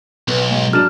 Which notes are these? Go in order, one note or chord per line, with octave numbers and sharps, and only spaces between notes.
B1 B3
G#2
F#3 D4 F6 E7